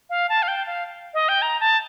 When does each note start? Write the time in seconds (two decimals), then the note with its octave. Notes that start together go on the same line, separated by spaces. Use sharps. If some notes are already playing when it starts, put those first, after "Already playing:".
0.10 F5
0.29 A5
0.43 F5
0.48 G5
0.67 F5
1.14 D#5
1.29 G5
1.42 A#5
1.60 A5